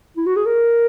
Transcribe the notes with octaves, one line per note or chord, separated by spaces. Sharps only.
E4
F#4
G#4
A#4